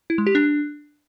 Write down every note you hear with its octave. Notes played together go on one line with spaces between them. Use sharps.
E4
G#3
G4
D4